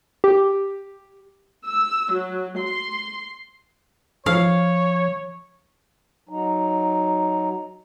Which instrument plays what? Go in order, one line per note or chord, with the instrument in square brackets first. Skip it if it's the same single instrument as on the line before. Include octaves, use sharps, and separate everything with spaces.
[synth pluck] G4
[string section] E6
F#3
C6
[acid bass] F3 [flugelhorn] C#5 [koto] F5
[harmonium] F#3 D#4